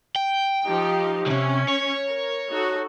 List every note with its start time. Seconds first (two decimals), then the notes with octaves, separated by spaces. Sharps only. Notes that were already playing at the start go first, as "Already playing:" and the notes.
0.16 G5
0.66 F3 D#4 G4
1.26 C#2 C3 C#4
1.68 C#5
2.07 A#4
2.49 D#4 F#4 A4